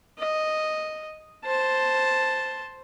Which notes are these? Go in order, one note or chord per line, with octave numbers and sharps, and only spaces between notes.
D#5
C5 A5